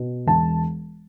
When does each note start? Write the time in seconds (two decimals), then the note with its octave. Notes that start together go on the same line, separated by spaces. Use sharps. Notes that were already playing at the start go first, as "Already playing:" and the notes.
Already playing: B2
0.27 E1 A5